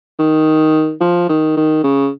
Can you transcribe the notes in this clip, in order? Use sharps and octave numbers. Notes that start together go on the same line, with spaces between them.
D#3
F3
D#3
D#3
C#3